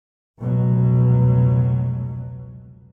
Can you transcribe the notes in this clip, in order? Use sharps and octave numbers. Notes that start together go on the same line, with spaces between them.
F1 C#2 B2 F#3